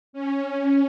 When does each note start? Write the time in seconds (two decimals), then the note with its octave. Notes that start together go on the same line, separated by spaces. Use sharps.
0.13 C#4